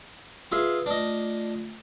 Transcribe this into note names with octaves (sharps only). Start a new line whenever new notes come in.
F4 G#4 B4 E5
A3 D4 F4 D#5